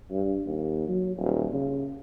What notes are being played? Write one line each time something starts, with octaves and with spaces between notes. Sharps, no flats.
G2
D#2
F#3
D#1
C#3